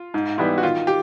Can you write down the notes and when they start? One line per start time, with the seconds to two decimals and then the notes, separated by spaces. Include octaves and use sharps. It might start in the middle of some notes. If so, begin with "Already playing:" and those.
Already playing: F4
0.14 G#2
0.38 E3 G3 B3 E4
0.58 F#4
0.63 D#3 F4
0.87 G4